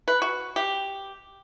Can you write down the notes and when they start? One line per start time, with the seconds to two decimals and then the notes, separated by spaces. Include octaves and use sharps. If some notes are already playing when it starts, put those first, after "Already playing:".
0.08 B4
0.22 F#4
0.56 G4